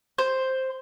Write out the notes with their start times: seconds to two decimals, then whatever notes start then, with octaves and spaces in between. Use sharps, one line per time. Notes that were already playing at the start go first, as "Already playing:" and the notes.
0.18 C5